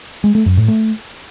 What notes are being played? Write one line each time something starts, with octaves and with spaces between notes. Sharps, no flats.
G#3
A3
F#2
A2
A3